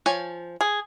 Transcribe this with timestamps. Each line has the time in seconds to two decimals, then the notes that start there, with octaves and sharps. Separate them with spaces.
0.06 F3 C#5 G#5
0.61 G#4